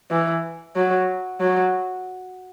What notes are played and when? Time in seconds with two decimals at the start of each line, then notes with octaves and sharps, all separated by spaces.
0.11 E3
0.75 F#3
1.40 F#3